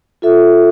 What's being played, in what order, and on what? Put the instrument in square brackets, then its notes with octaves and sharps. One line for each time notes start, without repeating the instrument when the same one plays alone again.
[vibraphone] F4 A4 E5